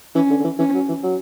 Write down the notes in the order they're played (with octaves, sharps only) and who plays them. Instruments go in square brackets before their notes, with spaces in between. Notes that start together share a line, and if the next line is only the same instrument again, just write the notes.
[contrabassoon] E3 [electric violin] C#4
[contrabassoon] D3
D3
E3
[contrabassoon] E3 [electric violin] C#4
[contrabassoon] F#3
E3
F#3